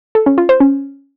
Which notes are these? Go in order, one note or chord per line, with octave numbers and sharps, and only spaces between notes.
A4
C#4
F4
C5
C#4